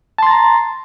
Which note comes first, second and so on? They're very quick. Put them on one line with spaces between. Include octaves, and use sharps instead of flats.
A5 C6 A6 A#5